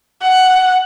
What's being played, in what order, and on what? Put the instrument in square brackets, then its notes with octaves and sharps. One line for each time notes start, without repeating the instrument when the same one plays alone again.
[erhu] F#5